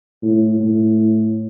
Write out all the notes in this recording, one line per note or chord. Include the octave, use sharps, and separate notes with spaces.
A2
A2